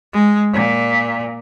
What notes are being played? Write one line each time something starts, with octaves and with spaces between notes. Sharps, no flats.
G#3
A#2